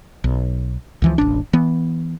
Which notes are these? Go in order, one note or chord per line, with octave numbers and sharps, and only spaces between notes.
B1
C#2 E3 F3
E1 A1 D4
E3 B3